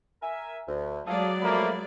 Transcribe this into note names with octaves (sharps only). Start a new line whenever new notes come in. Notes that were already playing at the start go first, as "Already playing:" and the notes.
A#4 E5 G#5
D2
F#3 G#3 A4 D5 F5 D#6
F3 A3 A#3 B5